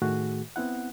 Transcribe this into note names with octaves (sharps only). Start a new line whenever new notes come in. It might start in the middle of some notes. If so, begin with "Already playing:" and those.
A2 D#3 A3 F#4 G#4
B3 C4 E4 F#5